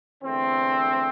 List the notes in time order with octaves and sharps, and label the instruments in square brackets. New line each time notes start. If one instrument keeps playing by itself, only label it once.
[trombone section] E2 D3 A3 C4